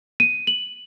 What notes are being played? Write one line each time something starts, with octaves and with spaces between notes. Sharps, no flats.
D#7
F#7